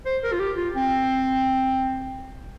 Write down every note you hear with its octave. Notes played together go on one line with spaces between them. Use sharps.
C5
A#4
F4
G4
F4
C4